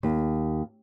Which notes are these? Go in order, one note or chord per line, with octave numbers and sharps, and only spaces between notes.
D#2